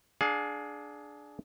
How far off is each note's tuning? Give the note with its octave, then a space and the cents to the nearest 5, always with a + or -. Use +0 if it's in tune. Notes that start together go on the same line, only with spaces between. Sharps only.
D4 +0 G#4 +15 F5 +35